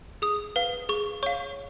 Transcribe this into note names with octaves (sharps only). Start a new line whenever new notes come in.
G#4 D#6
B4 F5
G#4 C#6
C#5 F5 C#6